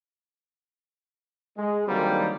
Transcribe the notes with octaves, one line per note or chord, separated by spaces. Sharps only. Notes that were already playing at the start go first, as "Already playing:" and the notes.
G#3
D3 D#3 F#3 G3 A#3 C4